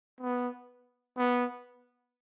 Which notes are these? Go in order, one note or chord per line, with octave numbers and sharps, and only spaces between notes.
B3
B3